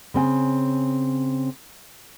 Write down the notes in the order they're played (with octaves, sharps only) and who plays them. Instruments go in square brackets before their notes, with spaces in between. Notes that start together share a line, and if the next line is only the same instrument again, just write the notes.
[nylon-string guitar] C#3 C4 G#5